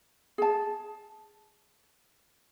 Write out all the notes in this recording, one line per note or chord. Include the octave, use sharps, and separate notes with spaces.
G#4 A5